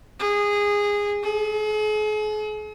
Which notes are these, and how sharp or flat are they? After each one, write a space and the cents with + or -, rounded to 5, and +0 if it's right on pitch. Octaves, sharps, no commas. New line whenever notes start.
G#4 -15
G#4 +45